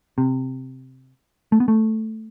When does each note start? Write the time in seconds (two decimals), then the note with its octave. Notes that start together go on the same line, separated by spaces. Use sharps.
0.18 C3
1.52 A3
1.60 B3
1.68 A3